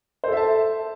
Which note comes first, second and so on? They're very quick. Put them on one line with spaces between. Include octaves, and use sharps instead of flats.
C5 A4 E5 A5